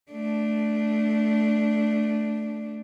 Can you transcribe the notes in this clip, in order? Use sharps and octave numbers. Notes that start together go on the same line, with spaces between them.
A3 D4